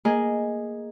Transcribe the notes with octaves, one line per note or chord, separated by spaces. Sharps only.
A#3 G#4 D#5